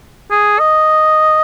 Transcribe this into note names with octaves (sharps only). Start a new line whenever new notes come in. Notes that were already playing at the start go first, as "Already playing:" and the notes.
G#4
D#5